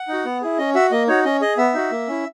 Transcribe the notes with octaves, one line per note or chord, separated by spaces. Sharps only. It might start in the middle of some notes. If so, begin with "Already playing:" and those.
Already playing: F#5
D#4 F#4
B3
E4 G#4
C#4 D#5
F#4 E5
A#3 D#5
D#4 F#4 C#5
C#4 D#5
G#4 D#5
B3 E5
D#4 F#4
A#3
C#4 E4